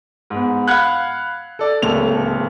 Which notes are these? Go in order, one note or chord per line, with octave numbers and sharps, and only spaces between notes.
G#2 B3
F5 F#5 B5 F#6 G#6
A4 D5
D1 C#2 A3 A#3 A4 F7